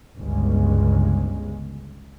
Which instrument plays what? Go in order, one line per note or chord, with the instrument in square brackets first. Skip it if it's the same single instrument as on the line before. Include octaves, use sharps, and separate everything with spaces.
[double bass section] G1 C#2 C#3 G#3